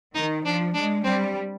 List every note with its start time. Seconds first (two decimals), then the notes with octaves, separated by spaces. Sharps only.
0.15 D#3 D#4
0.45 F3 D4
0.74 G#3 D4
1.04 G3 C4